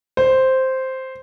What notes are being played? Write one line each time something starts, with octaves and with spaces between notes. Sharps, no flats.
C5